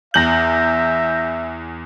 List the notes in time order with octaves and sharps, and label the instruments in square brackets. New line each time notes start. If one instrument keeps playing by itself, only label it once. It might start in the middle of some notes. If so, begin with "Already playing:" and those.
[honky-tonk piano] E2 F#7 [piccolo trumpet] E5 [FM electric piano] G6 A#6